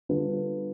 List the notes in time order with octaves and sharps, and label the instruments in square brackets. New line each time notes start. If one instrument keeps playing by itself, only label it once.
[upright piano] D3 G3 B3 F4 B4